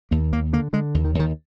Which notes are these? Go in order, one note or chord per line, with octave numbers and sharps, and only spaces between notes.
D#2 A#3
D#2 A#3
D3 A#3
D3 G#3
D#2
D#3
D#2
D#3